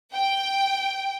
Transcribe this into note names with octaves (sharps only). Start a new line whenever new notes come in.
G5